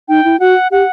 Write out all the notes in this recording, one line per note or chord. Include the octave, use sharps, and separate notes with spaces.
D#4 G5
E4
F#4 F#5
G4 F#5